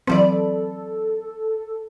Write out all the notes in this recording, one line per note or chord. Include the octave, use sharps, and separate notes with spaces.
E3 F#3 C4 A4 B4 C5 D5